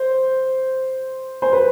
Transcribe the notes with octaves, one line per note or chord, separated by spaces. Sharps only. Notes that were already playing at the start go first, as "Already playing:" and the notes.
Already playing: C5
C5
B4